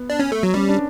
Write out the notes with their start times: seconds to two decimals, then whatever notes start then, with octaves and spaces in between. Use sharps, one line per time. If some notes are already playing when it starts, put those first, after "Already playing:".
Already playing: B3
0.10 D4
0.20 C#4
0.32 A3
0.43 F#3
0.54 G3 C#4
0.69 D4